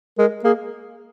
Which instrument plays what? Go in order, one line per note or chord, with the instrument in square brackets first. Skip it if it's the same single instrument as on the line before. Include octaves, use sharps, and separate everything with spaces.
[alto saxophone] G#3 [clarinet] A#4
[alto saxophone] A#3 [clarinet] G#4